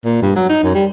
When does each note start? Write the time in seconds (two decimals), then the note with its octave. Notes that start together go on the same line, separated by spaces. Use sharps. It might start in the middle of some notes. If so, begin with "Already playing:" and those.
0.05 A#2
0.22 G2
0.36 F#3
0.49 D#4
0.63 F#2
0.75 G3